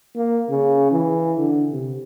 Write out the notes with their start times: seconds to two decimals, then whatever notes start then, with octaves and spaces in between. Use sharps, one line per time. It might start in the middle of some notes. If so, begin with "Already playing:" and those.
0.16 A#3
0.50 C#3
0.92 E3
1.38 D3
1.72 C3